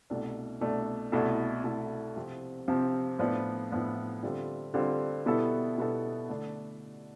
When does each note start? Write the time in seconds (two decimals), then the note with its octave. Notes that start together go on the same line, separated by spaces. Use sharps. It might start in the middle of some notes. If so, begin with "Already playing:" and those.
0.10 C2 B2 A3 D4
0.61 C2 B2 A3 D4
1.12 C2 B2 A3 E4 A4
1.64 C2 B2 A3 E4 A4
2.16 C3 F3 C4
2.68 C3 F3 C4
3.19 A2 F3 B3 D4
3.71 A2 F3 B3 D4
4.23 D3 G3 C4 F4 A4
4.74 D3 G3 C4 F4 A4
5.26 B2 G3 B3 E4 A4
5.78 B2 G3 B3 E4 A4
6.29 D3 A3 D4